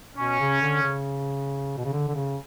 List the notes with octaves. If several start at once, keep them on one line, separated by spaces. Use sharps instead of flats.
B2 C#4
C#3
D3
C#3
B2
C#3
D3
D3
C#3